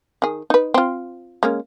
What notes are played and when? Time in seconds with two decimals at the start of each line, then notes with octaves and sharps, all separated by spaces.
0.22 D#3 G#4
0.50 D#4 B4
0.74 C4 F4
1.43 G#3 A#3 C#4